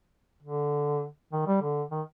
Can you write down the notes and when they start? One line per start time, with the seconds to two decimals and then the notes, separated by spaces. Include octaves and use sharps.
0.43 D3
1.33 D#3
1.47 G3
1.62 D3
1.91 D#3